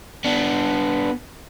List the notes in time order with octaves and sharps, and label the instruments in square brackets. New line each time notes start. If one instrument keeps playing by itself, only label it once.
[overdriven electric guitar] B3 D4